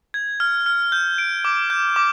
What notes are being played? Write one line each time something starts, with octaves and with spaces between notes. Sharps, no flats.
G#6
F6
F6
G6
D7
D6
G6
D6